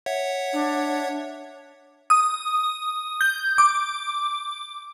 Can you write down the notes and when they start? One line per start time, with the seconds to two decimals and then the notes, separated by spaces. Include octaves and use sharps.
0.06 C#5 E5 F#5
0.53 D4
2.10 D#6
3.21 G6
3.58 D6